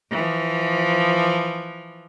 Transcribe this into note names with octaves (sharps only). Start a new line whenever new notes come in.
E3 F3